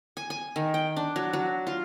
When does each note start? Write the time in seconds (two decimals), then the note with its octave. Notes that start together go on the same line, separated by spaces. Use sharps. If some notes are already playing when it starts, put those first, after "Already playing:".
0.17 G#5
0.30 G#5
0.56 D#3
0.74 G5
0.97 D4
1.16 F#3
1.33 F#3
1.67 F4